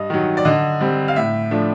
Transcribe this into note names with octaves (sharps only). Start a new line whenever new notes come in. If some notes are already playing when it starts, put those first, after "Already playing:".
Already playing: G2 D#5
D#3 F#3
D5
D3 D#5
G3 C4
F5
A2 E5
F3 A3 D4